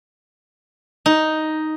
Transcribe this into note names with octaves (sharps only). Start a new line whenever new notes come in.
D#4